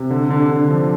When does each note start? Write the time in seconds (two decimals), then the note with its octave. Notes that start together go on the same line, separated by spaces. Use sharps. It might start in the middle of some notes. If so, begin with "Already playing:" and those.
Already playing: C3
0.10 D3
0.30 D3
0.51 D3
0.70 F3